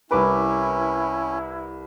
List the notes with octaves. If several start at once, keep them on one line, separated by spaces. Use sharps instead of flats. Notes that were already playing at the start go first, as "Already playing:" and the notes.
C2 C#4 E4 A#4 B4 D6